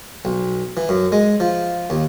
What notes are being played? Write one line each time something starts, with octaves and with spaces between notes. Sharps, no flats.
B1
E3
F#2
G#3
F3
D#2